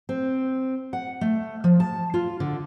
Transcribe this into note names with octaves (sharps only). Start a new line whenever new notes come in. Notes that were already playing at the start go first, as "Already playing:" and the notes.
C4
F#5
A3
F3
A5
F4
D3